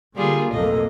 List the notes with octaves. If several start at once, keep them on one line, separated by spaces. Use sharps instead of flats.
D3 G3 A#3 F4 G#4
B1 F2 A2 A#3 A4 D#5